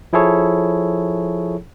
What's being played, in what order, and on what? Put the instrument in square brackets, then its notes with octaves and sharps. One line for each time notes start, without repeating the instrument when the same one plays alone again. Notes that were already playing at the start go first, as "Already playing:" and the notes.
[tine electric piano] F3 E4 G#4 A4 C#5